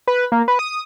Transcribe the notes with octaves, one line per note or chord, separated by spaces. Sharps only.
B4
A#3
B4
D#6